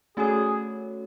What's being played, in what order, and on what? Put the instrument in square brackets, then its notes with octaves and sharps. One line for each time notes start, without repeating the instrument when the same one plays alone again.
[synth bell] A3 C#4 F#4 A4 C#5 [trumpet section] G#4